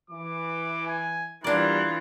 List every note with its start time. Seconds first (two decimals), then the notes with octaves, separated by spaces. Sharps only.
0.10 E3 D6
0.87 G#5
1.44 E2 E3 G3 D4 F4 A#4 D5